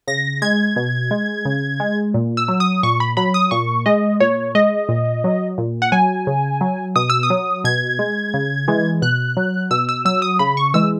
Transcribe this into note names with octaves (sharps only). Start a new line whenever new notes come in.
C#3 A#6
G#3 G#6
B2
G#3
C#3
G#3
A#2
E6
F#3
D#6
A#2 C#6
B5
F#3 B5
D#6
A#2 C#6
G#3 D#5
A#2 C#5
G#3 D#5
A#2
F#3
A#2
F#5
F#3 G#5
C#3
F#3
B2 D#6
E6
D#6
F#3
B2 G#6
G#3
C#3
E3 G#3
B2 F#6
F#3
B2 E6
E6
F#3 E6
D#6
C#3 B5
C#6
E3 G#3 E6